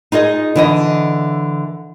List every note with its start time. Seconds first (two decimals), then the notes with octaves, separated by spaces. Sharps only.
0.12 D#4 F4 G#4 D#5
0.56 D3 E3 D#5